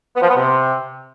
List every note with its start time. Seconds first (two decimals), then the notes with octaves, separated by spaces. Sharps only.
0.15 B3
0.22 F3
0.28 B3
0.35 C3